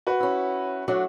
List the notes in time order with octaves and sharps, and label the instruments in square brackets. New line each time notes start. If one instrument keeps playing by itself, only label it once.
[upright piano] F#4 B4
[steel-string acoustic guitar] C#4 E4
[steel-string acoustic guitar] F#3 A3 D4 [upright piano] F#4